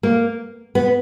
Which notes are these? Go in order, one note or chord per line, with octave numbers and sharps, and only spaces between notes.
A#3
B3